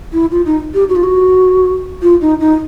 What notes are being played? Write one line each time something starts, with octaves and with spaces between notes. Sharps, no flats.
E4
F4
D#4
G4
F#4
F4
F#4
F4
D#4
D#4